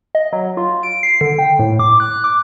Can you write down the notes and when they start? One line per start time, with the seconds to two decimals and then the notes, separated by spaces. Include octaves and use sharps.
0.15 D#5
0.33 F#3
0.57 F4
0.83 D7
1.03 C7
1.21 D3
1.38 G5
1.59 A2
1.79 D6
2.00 F#6
2.24 D6